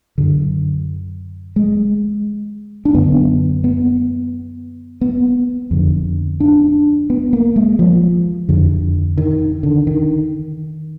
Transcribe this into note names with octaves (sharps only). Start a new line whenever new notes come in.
F#2 D3
G#3
D4
F#2 D3 B3
B3
B3
F2 D3
D4
B3
A#3
G#3
F3
F2 D3
D#3
D3
D#3